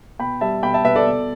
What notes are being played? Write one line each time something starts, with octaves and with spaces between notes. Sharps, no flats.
B2 G5 B5
G3 E5 A5
B2 G5 B5
E5 A5
B2 B4 E5
A4 D5
B2